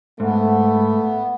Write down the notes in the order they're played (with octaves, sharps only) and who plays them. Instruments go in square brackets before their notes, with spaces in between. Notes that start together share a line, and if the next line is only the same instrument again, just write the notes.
[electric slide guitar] G#2 [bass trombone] A3 [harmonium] B3